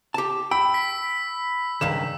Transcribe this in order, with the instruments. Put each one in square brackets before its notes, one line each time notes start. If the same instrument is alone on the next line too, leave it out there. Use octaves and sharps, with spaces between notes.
[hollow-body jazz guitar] G4 A5
[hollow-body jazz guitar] G5 [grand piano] B5 [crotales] E6
[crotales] B6
[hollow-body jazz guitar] C#2 G2 D#3 [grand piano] E7